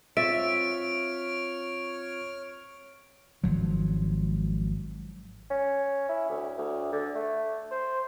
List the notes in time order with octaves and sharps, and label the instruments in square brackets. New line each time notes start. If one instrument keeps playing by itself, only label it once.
[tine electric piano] C4 F4 A6 [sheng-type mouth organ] C#5 F6 [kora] E5 [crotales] D7
[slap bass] G#1 F3 F#3
[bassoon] C#4
E4
D2
D2
D3
A3
C5